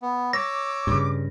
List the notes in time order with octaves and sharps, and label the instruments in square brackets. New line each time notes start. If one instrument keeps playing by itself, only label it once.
[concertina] B3
[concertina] C#5 E6 [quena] D6 [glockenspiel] A#6
[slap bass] G2 C#3